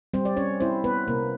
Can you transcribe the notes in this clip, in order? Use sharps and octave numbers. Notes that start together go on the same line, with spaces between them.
G3 C4 C5
D5
C#4 C#5
C4 E4 C5
B3 B4
C3 A#3 A#4